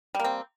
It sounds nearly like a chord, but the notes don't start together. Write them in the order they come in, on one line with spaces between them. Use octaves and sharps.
G3 A#3 C4